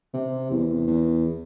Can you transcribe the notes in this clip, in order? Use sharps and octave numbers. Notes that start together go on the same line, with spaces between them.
C3
E2
E2